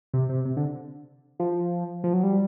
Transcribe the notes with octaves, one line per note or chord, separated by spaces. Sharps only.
C3
C3
C3
D3
F3
F3
F#3
G3